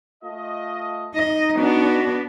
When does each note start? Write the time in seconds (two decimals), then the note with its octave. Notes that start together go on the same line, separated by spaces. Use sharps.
0.23 A3 F4 D#5
1.15 D#4 D#5
1.56 B3 D4 F#4